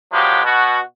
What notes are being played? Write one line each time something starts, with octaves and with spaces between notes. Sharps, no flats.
F3 F#3 G#3 B3 G4
B2 F#4